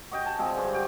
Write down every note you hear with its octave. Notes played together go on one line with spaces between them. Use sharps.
F#4 D#5 G5
G#5 A5
D3 F3 G#3 C4
G2
F#4 G5